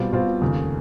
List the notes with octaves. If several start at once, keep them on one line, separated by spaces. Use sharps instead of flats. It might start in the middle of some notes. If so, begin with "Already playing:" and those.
Already playing: B2 G3 C4 F4
B2 G3 C4 F4
F1 D#2 C#3